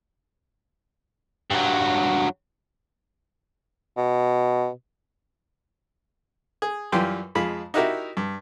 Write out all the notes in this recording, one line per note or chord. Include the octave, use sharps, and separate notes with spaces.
G2 F#3
B2
G#4
F#2 E3 G3 F4 G5 C6
F2 G#3 F4 B5
D#4 E4 F#4 G4 A#4 E5
G2